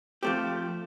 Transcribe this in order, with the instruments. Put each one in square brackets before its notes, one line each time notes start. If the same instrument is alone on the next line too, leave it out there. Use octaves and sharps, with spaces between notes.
[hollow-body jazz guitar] F3 A3 C4 G4